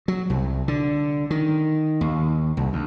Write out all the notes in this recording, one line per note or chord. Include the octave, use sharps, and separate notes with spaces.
F#3
C2
D3
D#3
D#2
C2
D2